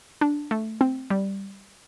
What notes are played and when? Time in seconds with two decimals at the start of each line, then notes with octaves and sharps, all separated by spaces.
0.21 D4
0.51 A3
0.81 C4
1.10 G3